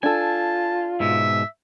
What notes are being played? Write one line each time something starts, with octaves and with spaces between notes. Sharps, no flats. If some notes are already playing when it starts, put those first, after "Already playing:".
D4 F4 A4 G#5 A5
G#2 B2 E5